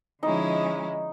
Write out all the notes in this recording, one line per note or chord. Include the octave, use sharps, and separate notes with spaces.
D3 F3 G#3 C#4 D#4 E4